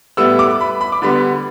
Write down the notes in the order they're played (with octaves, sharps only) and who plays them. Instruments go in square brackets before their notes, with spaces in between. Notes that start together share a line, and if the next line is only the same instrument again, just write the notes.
[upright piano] A2 G3 B3 E6
D6
B5
B5
D6
D3 G3 B3 B5